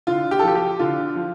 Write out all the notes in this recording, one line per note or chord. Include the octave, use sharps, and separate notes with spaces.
D3 F4
G4
A4
F3 G4
G4
D3 F4
F3